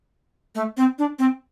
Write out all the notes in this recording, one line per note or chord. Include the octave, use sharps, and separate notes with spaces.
A3
C4
D4
C4